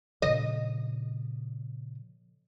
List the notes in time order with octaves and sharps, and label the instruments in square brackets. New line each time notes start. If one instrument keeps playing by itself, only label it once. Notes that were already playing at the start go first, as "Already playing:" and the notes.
[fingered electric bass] A#2 C#3 F3 [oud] D#5